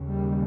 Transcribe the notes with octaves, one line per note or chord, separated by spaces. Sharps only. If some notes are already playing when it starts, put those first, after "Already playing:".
Already playing: D#2 C#3
G3